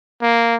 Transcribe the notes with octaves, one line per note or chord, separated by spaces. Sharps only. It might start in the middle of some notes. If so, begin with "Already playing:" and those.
A#3